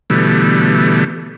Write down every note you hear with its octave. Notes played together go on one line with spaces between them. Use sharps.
B2 D3 E3 G3 A3